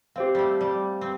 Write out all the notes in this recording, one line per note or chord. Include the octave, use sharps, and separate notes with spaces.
C4 G4 C5 F5
G3 A3
G3
C4